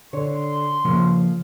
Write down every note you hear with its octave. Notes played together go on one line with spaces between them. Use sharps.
D3 C#5 C6
C#3 F3 A#3